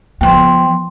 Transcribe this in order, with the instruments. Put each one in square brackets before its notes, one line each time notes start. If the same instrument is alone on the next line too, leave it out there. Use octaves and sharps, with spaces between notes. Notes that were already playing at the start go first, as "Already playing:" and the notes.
[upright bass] F3 B3 [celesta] G5 C6